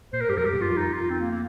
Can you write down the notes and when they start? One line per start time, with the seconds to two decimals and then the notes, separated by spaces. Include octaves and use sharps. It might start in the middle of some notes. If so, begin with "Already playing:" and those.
0.13 A#2 C5
0.21 A#4
0.29 G2 G4
0.37 F2 A#4
0.45 G2 G4
0.53 A#2
0.61 G2 F4
0.69 F2
0.77 D#4
0.93 F4
1.10 C4
1.20 A#3
1.31 A#3